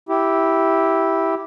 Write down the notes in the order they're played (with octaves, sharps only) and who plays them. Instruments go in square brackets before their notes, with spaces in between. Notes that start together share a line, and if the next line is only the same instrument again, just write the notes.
[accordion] E4 G4